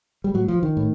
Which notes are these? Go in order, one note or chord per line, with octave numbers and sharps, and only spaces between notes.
G3
A2 F#3
F3
D#3
A2